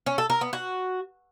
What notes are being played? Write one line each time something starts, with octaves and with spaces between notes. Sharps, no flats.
C#4
A4
A#4
B3
F#4